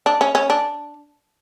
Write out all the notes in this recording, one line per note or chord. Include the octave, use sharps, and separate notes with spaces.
D4
C#4
C#4
D4